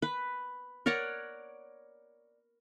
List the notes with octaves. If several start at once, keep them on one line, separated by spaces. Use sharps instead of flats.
B4
A#4 C#5 D5 F#5